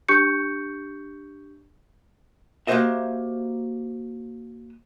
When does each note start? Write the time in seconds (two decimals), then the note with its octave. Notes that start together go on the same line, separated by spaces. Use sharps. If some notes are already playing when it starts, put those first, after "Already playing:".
0.09 D4 G4 C#6 G6 C#7
2.67 A#3 F#4 G4 C5 D#5 E5